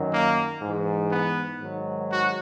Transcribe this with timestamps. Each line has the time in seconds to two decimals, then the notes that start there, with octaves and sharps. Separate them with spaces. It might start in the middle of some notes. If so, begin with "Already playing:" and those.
Already playing: F#2 D#3 F#3
0.11 A#3
0.61 G#2 E3
1.10 B3
1.60 G#2 D#3 F#3
2.10 F#4